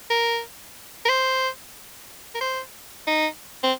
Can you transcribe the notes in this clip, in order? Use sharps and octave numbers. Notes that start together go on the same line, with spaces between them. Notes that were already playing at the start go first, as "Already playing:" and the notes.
A#4
A#4
C5
A#4
C5
D#4
C4